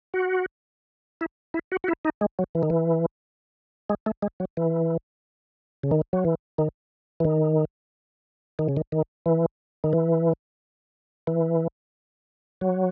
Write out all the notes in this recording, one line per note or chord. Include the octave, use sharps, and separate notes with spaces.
F#4
E4
E4
F#4
F#4
E4
D#4
G#3
F#3
E3
D#3
E3
G#3
A3
G#3
F#3
E3
C#3
D#3
F#3
E3
D#3
E3
D#3
D#3
C#3
D#3
D#3
E3
D#3
E3
E3
F#3